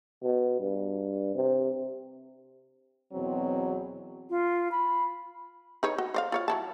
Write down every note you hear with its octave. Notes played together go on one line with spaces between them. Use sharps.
B2
G2
C3
E2 B2 F#3 C4
F4
B5
D#4 B4 C#5
F#4
C5 D5 F5
F4 C#5 F5
F#3 E4 A5